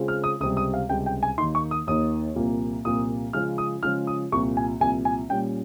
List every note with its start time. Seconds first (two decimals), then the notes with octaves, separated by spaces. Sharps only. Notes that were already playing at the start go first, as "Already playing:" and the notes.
Already playing: C#3 G#3 C4 F4
0.08 F6
0.24 D#6
0.40 C#2 C3 G3 D#6
0.57 D#6
0.74 F5
0.89 C#2 C3 G3 G5
1.06 G5
1.23 G#5
1.38 D#2 D#3 A#3 D#4 C6
1.55 C#6
1.71 D#6
1.87 D#2 D#3 A#3 D#4 D#6
2.36 C2 A#2 F3 A#3
2.85 C2 A#2 F3 A#3 D#6
3.33 C#3 F3 G#3 C#4 F4 F6
3.58 D#6
3.83 C#3 F3 G#3 C#4 F4 F6
4.07 D#6
4.32 C2 A#2 F3 C#6
4.57 G#5
4.81 C2 A#2 F3 G#5
5.05 G#5
5.29 A#2 G3 C#4 G5